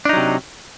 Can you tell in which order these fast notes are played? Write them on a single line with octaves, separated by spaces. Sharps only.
D4 D#4 F#3 C3